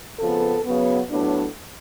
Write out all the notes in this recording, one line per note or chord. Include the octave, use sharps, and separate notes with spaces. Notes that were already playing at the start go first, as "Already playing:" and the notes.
F2 C#3 F3 B3 A4
C#3 F#3 B3
A2 F#3 B3 D4